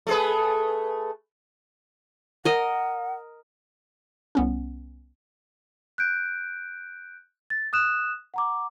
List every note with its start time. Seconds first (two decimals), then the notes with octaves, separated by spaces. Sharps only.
0.07 A3 G#4 B4
2.45 A#4 D#5 F#5
4.35 C2 B3 C#4
5.98 F#6 G6 D7
7.50 A6
7.73 D#6 F#6 E7
8.34 F#5 A#5 D6